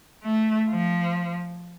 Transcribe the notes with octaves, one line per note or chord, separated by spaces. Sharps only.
A3
F3